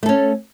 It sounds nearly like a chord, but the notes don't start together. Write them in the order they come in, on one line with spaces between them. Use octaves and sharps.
A3 A4 C#4